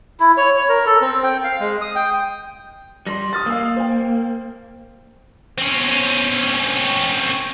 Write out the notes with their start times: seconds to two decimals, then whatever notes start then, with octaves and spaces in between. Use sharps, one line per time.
0.20 E4
0.37 C#5
0.57 C#5
0.69 A#4
0.86 A4
1.01 C4
1.23 G5
1.44 F5
1.60 G#3
1.81 D#6
1.95 G5
3.07 G3 C6 A#6
3.33 D#6 F6 A6
3.46 A#3 F5 E6
3.76 C5 G5
5.58 C4 C#4